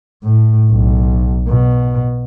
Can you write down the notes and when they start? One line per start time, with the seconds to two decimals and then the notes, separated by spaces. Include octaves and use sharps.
0.23 A2
0.71 B1
1.48 B2